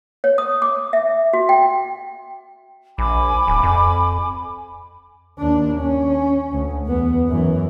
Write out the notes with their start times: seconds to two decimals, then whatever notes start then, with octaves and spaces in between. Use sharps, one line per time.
0.24 C#5
0.38 D#6
0.62 D6
0.93 E5
1.33 F#4
1.49 G5
2.98 A#1 G#5 B5 D6
3.47 D1
3.63 F2
5.39 D#2 D4
5.80 C#4
6.52 D2
6.86 E2 B3
7.27 F#2 E3